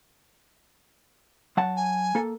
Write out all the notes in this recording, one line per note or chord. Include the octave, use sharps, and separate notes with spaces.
F#3 F#5 A5
G#5
A#3 A4